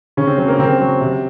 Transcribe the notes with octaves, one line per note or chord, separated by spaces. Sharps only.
C#3 C#4
C4
F#3 C4
A#3
C#3 C4
F#3
C3